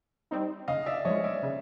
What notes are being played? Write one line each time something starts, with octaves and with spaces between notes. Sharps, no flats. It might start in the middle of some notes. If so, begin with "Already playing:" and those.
G3 C4 D#4
C#3 D#5 F5
D5 E5
F3 G#3 C#5 D#5
D5 E5
C#3